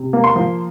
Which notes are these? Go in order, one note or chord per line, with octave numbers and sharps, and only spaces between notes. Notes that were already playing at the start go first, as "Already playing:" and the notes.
Already playing: C3
A#3
C6
F3